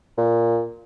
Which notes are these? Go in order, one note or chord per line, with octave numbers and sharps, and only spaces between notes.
A#2